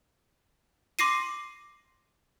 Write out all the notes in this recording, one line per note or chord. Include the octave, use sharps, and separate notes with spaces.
C6 D6 A#6 C7 D#7